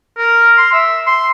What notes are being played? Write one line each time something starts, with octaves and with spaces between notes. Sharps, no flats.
A#4
C6
E5
C6